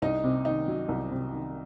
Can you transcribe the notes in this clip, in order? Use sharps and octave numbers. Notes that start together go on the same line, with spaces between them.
C2 D#4 D#5
C3
D#3 D#4 D#5
F#3
C2
C3
D#3